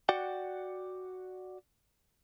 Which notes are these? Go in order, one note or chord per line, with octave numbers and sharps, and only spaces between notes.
F#4 D5 F#5 G5